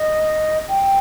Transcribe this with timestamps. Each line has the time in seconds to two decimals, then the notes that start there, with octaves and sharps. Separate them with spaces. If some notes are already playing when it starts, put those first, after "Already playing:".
Already playing: D#5
0.68 G5